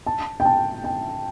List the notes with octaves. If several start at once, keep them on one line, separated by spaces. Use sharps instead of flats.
A5
G5
A5
G5